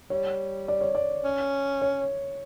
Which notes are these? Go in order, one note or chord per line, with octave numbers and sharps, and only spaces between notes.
G3 C#5
D5
C#5
D5
C#4
C#5